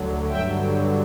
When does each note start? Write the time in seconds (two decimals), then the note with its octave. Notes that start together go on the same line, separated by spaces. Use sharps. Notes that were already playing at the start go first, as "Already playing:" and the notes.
Already playing: D2 D3 F#3
0.28 G2 D3 F#3 E5 G5